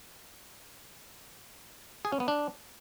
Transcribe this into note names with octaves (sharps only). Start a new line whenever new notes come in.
G#4
C#4
B3
D4